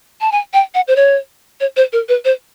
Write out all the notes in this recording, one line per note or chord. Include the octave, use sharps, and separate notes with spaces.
A5
G#5
G5
F#5
C5
C#5
C#5
C5
A#4
B4
C5